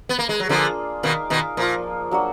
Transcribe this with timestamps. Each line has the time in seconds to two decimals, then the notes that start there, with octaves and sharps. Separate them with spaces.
0.09 B3
0.19 A#3
0.29 G#3
0.40 F#3
0.49 D3 F3 A#3 D4 F4 G#4
1.03 B2 D#3 D#4 A#4 F5
1.30 B2 D#3
1.57 A#2 F3 A#3 F4
2.11 F#3 A#3 D4 F#4